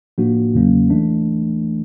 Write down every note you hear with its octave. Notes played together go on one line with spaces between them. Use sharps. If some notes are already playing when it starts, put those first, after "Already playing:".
A2 F3 A#3 D4 F#4
E2 C#3 F#3 A#3 C#4
E3 A3 D4